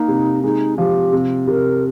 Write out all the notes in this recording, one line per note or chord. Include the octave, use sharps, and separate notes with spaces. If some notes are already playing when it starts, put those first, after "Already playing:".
Already playing: A#3 D#4
C3
G#3 D#4
F3 G4
C3
C3 A#4